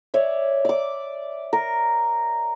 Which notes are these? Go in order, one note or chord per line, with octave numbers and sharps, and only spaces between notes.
C#5 D5 E5
D5 D6
A#4